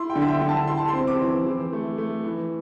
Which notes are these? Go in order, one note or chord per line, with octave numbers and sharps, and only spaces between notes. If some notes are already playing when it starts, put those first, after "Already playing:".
Already playing: E4 C6
G5
D3
E5
G5
D3
A5
E4 C6
A5
C6
C4
D6
E3
E3
A3
A3
E3